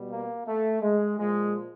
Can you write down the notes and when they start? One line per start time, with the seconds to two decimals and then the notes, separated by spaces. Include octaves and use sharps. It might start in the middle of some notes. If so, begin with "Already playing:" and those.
Already playing: B2 G3
0.12 A#3
0.47 A3
0.82 G#3
1.18 A#2 F3 G#3